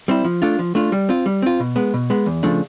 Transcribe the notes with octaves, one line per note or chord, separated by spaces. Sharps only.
G3 C4 E4
F3
A3 D4 F4
F3
A3 D4 F4
G3
C4 F4
G3
C4 F4
B2
G#3 B3
B2
G#3 B3
E2
C#3 F3 A3 D4